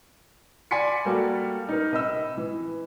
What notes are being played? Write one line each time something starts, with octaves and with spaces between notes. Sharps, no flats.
D5 G#5 B5 C6 B6 C#7
G3 A#3 F#4 A4
D#4 A#4
C3 D#5 B5 E6
E3